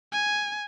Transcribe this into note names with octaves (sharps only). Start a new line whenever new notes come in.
G#5